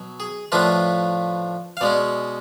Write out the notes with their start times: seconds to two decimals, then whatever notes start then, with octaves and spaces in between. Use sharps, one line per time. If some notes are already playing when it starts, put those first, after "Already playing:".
Already playing: B2 F#3
0.20 G#4
0.52 A2 F3 A3 D4 F4 B4
1.77 F5
1.81 B2 G#3 C#4 D5